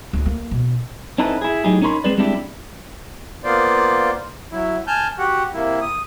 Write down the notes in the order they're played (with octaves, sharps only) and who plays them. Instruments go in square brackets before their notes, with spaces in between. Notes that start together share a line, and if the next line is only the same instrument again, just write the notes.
[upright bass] D2
A#3
B2
[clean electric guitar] C4 C#4 D#4 E4 A4 B4
E4 G#4
A2 F#3 D#4 G4 G#4
C#4 D#4 A#4 C#5 B5 C6
G#3 C4 G#4 B4 D5
G3 G#3 C4 D4 E4 G4
[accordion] A#3 B3 F4 C5 D5
F#3 E4
G#5 A5 F6 G6
F#4 G4 F#5
C3 A#3 E4
D#6